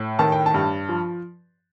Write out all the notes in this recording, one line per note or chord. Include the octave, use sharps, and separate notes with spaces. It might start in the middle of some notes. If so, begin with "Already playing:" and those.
Already playing: A2
D#3 A5
G5
A5
G2
F3